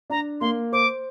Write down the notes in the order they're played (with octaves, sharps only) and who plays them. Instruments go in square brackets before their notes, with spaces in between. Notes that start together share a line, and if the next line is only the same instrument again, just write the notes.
[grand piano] D4 [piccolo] A#5
[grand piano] A#3 [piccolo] C6
[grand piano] C5 [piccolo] D6